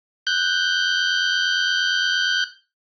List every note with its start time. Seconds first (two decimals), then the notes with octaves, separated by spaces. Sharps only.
0.27 F#6 G6